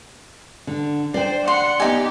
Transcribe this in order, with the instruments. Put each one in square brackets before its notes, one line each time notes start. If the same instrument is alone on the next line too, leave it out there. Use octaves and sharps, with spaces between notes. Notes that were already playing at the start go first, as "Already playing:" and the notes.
[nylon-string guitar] D3
[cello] D4 C5 [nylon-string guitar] D5 G5
[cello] F#5 [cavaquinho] C6
[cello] B3 G4 [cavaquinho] D#4 G#5